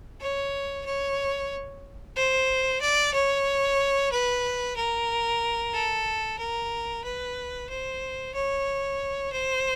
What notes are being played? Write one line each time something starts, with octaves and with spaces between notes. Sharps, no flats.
C#5
C#5
C5
D5
C#5
B4
A#4
A4
A#4
B4
C5
C#5
C5